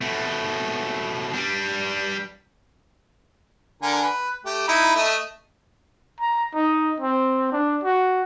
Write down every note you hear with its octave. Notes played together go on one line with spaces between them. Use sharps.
B2 A3
G3 D4
D3 A#4 G#5
B4
A3 G4
D#4 E4 B5
A3 D#5 E5
A#5
D#4
C4
D4
F#4